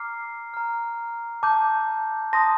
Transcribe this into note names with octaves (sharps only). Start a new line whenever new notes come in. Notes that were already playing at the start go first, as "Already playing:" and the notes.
Already playing: A#5 D6 F6 C7
A#5 F6
A5 D6 G6
A5 C6 D#6 A#6